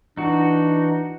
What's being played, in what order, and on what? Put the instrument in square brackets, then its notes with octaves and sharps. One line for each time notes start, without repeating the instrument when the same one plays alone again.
[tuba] E3 [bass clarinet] D4 [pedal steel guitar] D#4 F#4